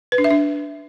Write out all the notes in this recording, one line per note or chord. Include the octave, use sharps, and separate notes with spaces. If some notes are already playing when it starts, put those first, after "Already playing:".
B4
D4
E5
D4